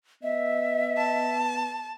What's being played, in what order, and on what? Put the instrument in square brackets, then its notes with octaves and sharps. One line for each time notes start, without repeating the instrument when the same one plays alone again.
[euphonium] B3 [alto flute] D#5 [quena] E5
[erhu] A5